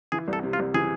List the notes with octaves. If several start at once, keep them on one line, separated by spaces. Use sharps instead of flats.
E3 G#4
C2
A4
C3
F4
C2
E3 G#4